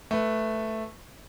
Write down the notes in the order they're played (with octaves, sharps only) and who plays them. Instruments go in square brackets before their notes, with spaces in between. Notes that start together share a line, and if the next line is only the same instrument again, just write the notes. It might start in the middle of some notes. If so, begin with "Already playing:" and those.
[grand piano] A3 B4